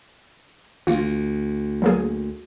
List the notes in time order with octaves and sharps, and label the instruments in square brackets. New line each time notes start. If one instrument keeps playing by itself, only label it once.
[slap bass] D2 [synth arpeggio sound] F4
[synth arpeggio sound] F#3 A#3 G#4